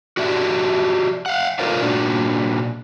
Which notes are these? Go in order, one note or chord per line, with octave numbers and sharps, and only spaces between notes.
F#4 G4 D5 E5
F5 F#5
F4 A4 A#4 C5 D5 F5
A#2 D4 F#4